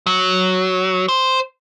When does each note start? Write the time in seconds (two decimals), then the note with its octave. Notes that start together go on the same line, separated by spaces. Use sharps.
0.07 F#3
1.09 C5